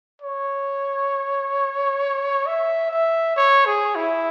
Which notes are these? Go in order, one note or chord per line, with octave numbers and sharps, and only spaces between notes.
C#5
E5
E5
C#5
G#4
E4